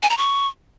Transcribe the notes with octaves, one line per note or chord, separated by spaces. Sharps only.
G#5
A#5
C#6